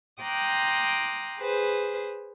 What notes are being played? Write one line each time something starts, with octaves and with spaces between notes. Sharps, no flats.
G5 A#5 C6 D6 D#6 F#6
G#4 B4 C5